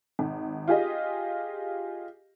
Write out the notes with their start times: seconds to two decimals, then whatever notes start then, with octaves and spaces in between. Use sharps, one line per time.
0.19 G#1
0.68 F4 G4 G#4 D#5